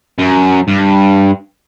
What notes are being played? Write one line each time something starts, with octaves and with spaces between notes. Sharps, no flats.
F#2
G2